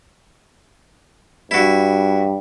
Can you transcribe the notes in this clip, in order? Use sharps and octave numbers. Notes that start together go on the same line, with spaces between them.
G2 E4 F#4